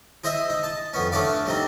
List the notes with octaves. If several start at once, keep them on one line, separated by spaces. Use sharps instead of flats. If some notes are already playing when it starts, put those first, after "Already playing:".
G#4 C5 D#5 E5
D#4
A5
F2 B3 C#4
A3 C#4 D4 D5 F5
G3 C4 D#4